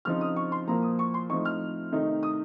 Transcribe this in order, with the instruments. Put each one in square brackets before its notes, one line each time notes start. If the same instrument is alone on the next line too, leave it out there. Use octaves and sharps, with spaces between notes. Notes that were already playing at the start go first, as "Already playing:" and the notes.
[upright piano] C#3 F3 C4 D#4 F6
D#6
C#6
C6
A#2 F3 A#3 A#5
D#6
C#6
C6
A2 F3 C4 D#4 C#6
F6
C3 D#3 A3 D#4
D#6